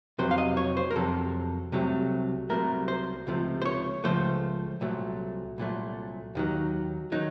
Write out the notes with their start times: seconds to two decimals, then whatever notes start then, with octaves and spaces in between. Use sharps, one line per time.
0.19 F2 C3 F#3 C5
0.31 F5
0.38 D#5
0.57 C#5
0.77 C5
0.91 A#4
0.96 F2 C3 F#3 A4
1.72 C2 C3 F#3 A3
2.50 C2 C3 F#3 A3 A#4
2.88 C5
3.27 C#2 C3 F3 A3
3.62 C5
3.65 C#5
4.04 C#2 C3 F3 A3 C5
4.81 C2 A#2 F#3 A3
5.58 C2 A#2 F#3 A3
6.35 D#2 D#3 F#3
7.12 D#3 F#3 D#4